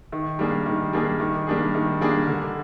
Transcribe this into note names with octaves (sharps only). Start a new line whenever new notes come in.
D#3
G3 A#3 D4 G#4
D#3
G3 A#3 D4 G#4
D#3
G3 A#3 D4 G#4
D#3
G3 A#3 D4 G#4
D3